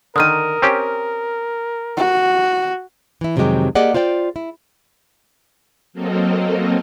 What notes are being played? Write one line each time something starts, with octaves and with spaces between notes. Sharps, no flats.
D3 D#3 A#4 D#6 F6 D#7
C4 C#4 G4
F#4
E3 E4
F2 C3 D#3 F#3 G#3 G4
A#3 G4 G#4 D5 D#5 F#5
F4 C5 D5 F#5 G5
E4
F#3 A#3 C4 A4 A#4 D#5